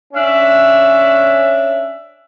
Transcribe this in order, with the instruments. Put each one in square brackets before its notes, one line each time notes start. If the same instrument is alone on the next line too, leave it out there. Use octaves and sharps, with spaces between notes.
[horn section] C#4 D4 E5